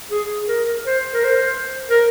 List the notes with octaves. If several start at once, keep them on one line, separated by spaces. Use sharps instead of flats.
G#4
A#4
C5
A#4
C5
A#4